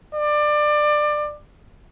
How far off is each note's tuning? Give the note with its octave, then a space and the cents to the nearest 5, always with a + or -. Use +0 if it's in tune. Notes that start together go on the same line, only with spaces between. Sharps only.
D5 +25